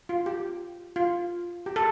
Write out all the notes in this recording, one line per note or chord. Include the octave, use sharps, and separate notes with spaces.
F4
G4
F4
G4
A4